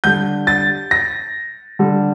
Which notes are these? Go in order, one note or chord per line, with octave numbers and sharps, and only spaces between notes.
D3 G3 G6
A6
A#6
D3 G3